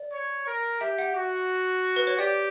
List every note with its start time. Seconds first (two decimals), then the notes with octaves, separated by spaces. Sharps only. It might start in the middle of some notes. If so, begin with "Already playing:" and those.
Already playing: D5
0.12 C#5
0.47 A#4
0.81 G4 E5
0.98 F#5
1.15 F#4
1.96 B4
2.07 C#5
2.18 G4 D5